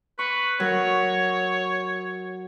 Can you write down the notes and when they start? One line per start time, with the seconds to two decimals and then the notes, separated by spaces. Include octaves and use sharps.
0.19 B4 C#6
0.60 F#3 A#4 C#5